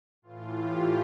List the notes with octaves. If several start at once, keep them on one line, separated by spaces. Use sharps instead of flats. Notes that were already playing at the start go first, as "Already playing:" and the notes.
A2 E3 F4
G4